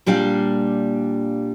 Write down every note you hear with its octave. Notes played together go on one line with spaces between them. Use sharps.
A#2 G3 D4 F5 G5